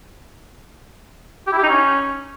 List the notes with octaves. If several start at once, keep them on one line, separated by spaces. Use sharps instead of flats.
G4
E4
G4
D#4
C#4